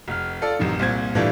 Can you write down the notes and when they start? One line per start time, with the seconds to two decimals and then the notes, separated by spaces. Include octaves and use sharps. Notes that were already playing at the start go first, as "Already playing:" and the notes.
0.08 F1 F6
0.41 F4 A4 D5
0.59 A1 F#2 C3 D#3
0.79 C2 A#2 C4 G#6
1.15 A2 E3 G3 A3 D4 F4